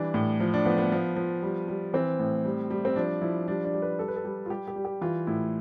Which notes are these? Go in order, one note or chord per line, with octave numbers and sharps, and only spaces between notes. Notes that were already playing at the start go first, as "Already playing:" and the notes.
Already playing: E3 G3 D4
A2
F3
D4
F3 B3
B3
F3
F3
G3
G3
E3 C4
A2
G3
G3
C4
F3 D4
F3 E4
G3 D4
D4
G3
B4
G3 A4
B4
A4
G3
F4
G3 G4
G4
G3
G4
E3 F4
A2 E4